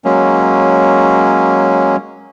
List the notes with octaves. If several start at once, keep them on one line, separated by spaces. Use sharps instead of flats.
F#3 G#3 A#3 C#4